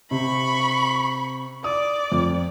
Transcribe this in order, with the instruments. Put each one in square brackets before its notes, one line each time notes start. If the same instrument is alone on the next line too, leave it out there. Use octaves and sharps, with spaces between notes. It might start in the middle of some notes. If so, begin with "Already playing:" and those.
[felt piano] C3 [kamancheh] B5 C#6
[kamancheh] D5 [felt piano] D#6
[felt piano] F2